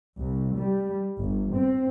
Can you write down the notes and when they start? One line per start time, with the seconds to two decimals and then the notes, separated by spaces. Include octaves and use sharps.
0.18 C2
0.56 G3
1.18 G1
1.53 C4